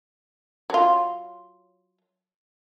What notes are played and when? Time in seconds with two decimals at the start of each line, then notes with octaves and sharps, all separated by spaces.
0.70 F#3 F4